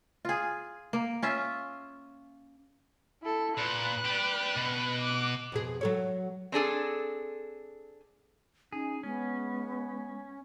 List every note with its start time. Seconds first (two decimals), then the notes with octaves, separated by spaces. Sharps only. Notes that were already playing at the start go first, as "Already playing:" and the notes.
0.25 F4 G#4
0.93 A#3
1.22 C#4 F4 E5
3.23 E4 A4
3.57 A#2 B4 F#6
4.05 G4 D5
4.56 B2
5.02 D6 F#6
5.52 F2 B2 G#4
5.81 F#3 A4 C#5
6.52 C4 D4 G#4 A4
8.73 C#4 D#4 G#4
9.03 G#3 B3 C#4